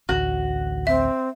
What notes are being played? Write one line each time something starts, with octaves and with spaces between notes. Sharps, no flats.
A1 D2 F#4
C4 E5